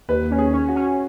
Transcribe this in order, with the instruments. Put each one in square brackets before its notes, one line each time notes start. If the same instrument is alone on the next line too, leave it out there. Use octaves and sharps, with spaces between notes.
[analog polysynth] D#2 [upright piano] B4
[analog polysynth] C#4
[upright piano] G#4
[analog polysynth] C#4
[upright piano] F#4
[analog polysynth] C#4